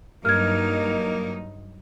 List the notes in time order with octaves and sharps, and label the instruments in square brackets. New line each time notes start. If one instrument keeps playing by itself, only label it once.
[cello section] G2 F#3 D#4 [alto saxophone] A#3 [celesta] F6 G#6